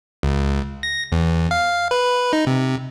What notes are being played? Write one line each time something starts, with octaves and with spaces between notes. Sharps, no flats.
C#2
A#6
E2
F5
B4
D#4
C3